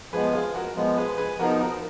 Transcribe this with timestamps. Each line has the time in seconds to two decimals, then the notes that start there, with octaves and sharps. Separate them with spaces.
0.13 F3 G#3 B3 G#4 B4
0.33 F4 G#4
0.55 F#4 A#4
0.75 F3 G#3 B3
0.97 G#4 B4
1.18 G#4 B4
1.39 F3 B3 D#4 F#4 A#4
1.60 F#4 A#4